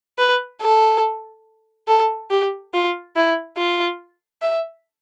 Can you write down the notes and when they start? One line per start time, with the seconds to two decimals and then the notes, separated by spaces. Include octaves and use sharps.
0.18 B4
0.61 A4
1.88 A4
2.30 G4
2.74 F4
3.16 E4
3.57 F4
4.42 E5